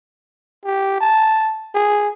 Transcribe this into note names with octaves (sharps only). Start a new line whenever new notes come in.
G4
A5
G#4